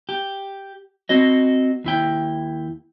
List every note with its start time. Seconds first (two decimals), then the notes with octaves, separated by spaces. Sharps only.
0.09 G4
1.09 C4 F#4 D#5
1.84 D#2 E4 G5